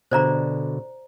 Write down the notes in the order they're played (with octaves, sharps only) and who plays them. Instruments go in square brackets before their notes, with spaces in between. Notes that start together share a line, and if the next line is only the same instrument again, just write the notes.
[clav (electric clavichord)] B2 D3 [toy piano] C5 D5 A#5